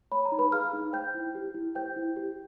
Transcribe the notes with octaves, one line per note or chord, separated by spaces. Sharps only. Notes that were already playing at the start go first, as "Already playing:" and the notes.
C#5 B5
A#5
D#4
B4 B5
G#4 F5 F6
D#4
C5 G5 G6
E4
G4
E4
C5 G5 G6
E4
G4